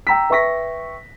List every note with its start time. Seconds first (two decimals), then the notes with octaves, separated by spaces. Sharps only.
0.07 G5 A#5 E6 B6
0.30 B4 E5 G5 C#6 A#6 B6